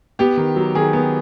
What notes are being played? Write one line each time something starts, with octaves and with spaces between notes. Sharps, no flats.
B3 G4
D#3
F#3
D#3 G#4
B3